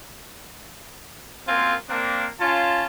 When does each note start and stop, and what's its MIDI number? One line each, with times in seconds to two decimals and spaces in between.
1.48 1.75 42
1.48 1.75 58
1.48 1.75 60
1.48 1.75 65
1.48 1.75 77
1.48 1.75 80
1.89 2.27 58
1.89 2.27 60
1.89 2.27 62
2.40 2.86 61
2.40 2.86 65
2.40 2.86 81